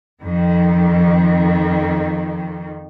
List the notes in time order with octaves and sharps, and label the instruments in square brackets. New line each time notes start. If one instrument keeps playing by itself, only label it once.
[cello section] F2 D#3